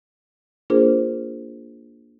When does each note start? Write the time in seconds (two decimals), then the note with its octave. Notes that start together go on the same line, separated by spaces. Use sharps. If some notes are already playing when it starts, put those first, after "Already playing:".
0.70 A#3 D4 F4 G#4 A#4 C5